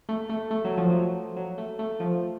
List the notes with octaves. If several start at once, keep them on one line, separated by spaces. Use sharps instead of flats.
A3
A3
A3
F#3
F3
F#3
F#3
A3
A3
F3